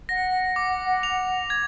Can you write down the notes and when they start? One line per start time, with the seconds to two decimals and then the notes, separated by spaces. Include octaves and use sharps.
0.09 F#5 A#6
0.56 D6
1.03 F7
1.50 G#6